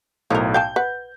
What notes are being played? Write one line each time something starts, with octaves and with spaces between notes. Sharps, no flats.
B1 A2 F3 A#4
F5 G5 A5 G6
B4 F#5